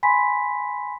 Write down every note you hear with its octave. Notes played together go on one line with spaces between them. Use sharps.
G#5 B5 C6 B6